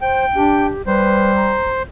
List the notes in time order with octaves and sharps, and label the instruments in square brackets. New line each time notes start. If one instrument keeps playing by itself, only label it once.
[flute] C5 [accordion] G5
[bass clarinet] D4 [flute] G4
[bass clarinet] G3 [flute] B4 [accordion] C5
[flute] A#5